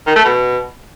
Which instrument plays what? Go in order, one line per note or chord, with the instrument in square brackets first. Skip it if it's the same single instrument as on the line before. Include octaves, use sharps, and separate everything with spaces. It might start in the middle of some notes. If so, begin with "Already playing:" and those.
[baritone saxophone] D#3
A3
B2